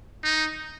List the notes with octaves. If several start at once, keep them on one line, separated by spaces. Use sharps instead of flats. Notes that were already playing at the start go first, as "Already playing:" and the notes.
D#4